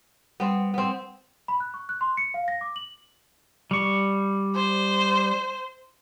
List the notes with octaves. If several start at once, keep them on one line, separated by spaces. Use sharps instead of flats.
G3 B3 C4
B3 C4
B5
F#6
C#6
F#6
C6
C#7
F5
A#6
D6
F#7
G3 C#6
C5